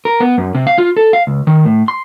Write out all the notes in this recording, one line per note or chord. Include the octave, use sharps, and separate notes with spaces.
A#4
B3
F#2
C3
F5
F4
A4
F5
C#2
D#3
A2
C6